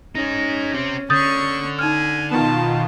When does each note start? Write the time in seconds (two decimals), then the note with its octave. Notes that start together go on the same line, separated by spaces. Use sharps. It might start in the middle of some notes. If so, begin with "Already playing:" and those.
0.15 C#4 D#4 G#4
0.73 C4 G4
1.10 D3 C#4 C#6 D#6 G6 A6
1.79 D#4 G#5 F6
2.31 B2 D#3 F4 A5